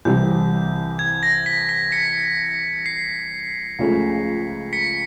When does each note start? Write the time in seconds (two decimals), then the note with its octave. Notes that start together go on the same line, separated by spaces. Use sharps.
0.05 C2 C3 E3 G3 G6
0.99 G#6
1.23 A#6
1.46 B6
1.69 B6
1.92 B6 C#7
2.86 C7
3.79 C#2 C#3 F3 A3 C#4
4.73 B6 C#7